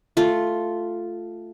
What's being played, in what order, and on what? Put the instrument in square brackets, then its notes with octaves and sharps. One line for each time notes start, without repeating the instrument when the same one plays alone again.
[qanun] A3 F4